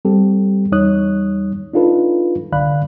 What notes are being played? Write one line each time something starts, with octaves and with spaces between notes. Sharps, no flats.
G3 C4 G4 A4
E2 G3 D#4 C#5 D#6 F#6
D4 D#4 F4 A4 B4
C2 D3 D5 F5 B5 F#6